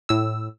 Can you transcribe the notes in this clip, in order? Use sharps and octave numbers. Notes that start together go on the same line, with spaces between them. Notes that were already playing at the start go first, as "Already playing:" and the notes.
A2 E6